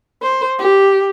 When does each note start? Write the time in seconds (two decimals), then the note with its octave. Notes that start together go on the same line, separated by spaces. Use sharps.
0.22 C5
0.59 G4